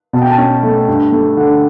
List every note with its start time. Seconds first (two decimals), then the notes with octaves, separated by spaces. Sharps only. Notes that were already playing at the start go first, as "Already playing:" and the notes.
0.13 B2 A5
0.22 G5
0.30 A5
0.38 C#4
0.63 A3
0.88 G2
1.12 A3
1.37 D3